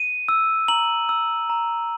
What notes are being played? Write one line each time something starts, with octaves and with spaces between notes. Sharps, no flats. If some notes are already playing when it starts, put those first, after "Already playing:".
Already playing: D#7
E6
A#5 F#7
E6
A#5